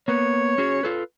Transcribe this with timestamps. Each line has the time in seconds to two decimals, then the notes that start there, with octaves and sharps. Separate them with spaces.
0.08 A#3 B3 C#5
0.58 C#4 F#4 G#4
0.83 F4 A4 B4